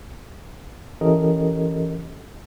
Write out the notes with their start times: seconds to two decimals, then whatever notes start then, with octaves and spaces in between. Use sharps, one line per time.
1.01 E3 C#4 G4 A4 A#4 D#5